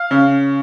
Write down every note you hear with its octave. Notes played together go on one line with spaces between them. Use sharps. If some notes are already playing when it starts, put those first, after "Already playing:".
Already playing: F5
C#3